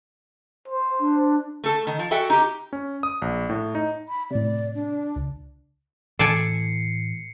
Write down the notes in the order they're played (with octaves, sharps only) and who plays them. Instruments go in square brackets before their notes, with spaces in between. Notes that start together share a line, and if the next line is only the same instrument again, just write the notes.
[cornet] C5
[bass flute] D4
[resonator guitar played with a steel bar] A3 A4
D#3
F3
F#4 A4 E5 G5
D#4 G4
[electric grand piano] C#4
D#6
A#1
A2
D#4
[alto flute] B5
[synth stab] A2 C3 [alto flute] D5
[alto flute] D4
[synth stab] C#2
[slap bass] A2 E3 [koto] A4 D5 G#5 [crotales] C7 C#7